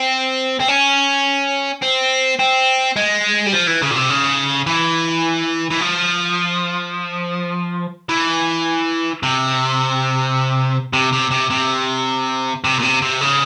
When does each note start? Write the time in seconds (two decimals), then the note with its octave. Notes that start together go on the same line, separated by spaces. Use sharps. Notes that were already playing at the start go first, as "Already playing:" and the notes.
Already playing: C4
0.60 C4
0.68 C#4
1.82 C4
2.39 C4
2.96 G#3
3.46 G3
3.53 F3
3.67 E3
3.82 C#3
3.91 A#2
3.96 C3
4.10 C#3
4.66 E3
5.71 E3
5.81 F3
8.09 E3
9.23 C3
10.93 C3
11.13 C3
11.31 C3
11.50 C3
12.64 C3
12.79 A#2
12.83 C3
13.02 C3
13.21 C#3